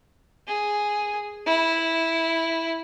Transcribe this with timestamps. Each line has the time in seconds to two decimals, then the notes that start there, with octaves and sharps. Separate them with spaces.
0.48 G#4
1.46 E4